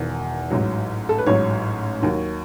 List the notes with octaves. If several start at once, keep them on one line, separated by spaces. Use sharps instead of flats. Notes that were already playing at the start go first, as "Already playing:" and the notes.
Already playing: E1 E2 D#3
A1 G#2 F#3
A4
B4
A1 G#2 F#3 C#5
D#2 D#3 F#3